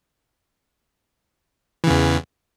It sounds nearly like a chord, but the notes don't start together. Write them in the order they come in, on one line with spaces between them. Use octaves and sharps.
E3 C#3 E2